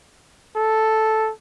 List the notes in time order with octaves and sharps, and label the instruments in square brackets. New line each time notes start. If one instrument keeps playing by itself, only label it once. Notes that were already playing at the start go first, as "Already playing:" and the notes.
[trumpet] A4